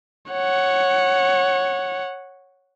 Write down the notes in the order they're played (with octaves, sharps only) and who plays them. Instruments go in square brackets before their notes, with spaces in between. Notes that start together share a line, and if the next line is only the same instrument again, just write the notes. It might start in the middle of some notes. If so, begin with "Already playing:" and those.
[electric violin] C#5 F#5